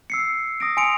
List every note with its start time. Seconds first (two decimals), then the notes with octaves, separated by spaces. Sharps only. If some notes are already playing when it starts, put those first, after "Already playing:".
0.10 E6 C7 C#7
0.60 D#6 A#6 D7
0.77 G#5 C6 C#7 D7 F7